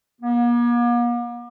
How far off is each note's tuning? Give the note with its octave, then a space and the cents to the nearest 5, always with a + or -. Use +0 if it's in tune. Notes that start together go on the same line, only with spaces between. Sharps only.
A#3 +45